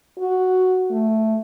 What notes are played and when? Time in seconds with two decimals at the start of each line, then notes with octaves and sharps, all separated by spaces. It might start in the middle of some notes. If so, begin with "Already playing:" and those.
0.19 F#4
0.91 A3